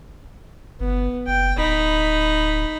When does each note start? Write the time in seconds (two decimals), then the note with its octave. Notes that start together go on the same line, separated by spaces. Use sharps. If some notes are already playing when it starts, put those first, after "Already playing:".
0.80 G1 B3
1.27 F#1 G5
1.57 D1 D#4 B5